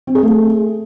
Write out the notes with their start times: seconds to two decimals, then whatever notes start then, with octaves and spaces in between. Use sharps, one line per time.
0.07 C4
0.15 G#4
0.23 A3